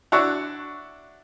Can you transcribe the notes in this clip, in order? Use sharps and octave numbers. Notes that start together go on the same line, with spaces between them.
D4 E4 F#4 C#5